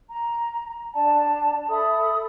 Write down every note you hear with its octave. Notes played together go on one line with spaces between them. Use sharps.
A#5
D4 D5 A5
A4 E5 B5 D#6